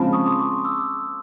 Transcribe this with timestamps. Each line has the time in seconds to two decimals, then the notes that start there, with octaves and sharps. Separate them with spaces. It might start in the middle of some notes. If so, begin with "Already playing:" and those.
Already playing: C#3 F3 G#3 C4 A5 B5
0.13 C#6 D#6
0.26 C6 D6
0.39 C#6 D#6
0.65 D6 E6